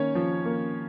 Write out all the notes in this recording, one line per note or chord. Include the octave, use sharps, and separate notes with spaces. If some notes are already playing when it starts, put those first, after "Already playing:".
Already playing: D#3 A#3 C#4 C#5
F3
A#3